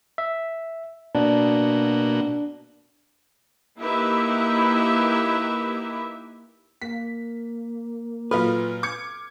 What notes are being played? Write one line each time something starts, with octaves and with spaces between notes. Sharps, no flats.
E5
B2 A#3 D4 F#4
A#3 D#4 E4 G4 B4 E5
A#3 B6
A#2 F#3 A4 B4 F5 F6
D6 G#6 C#7